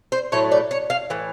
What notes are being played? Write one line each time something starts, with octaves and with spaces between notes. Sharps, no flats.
C5
A2 F#3 A3 C#5
D5
C#5
F5
A2 E3